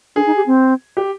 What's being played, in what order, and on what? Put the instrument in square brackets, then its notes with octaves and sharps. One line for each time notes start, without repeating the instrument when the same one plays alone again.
[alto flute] D4 [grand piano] G#4
[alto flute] D#4
G4
C4
[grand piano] G4